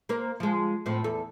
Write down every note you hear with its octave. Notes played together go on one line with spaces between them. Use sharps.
A#3 A#4 C5
F3 G#3
A2 F3 C4
E2 A4